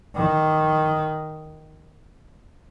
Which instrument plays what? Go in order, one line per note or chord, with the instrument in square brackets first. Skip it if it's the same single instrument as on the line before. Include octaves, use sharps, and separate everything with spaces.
[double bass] D#3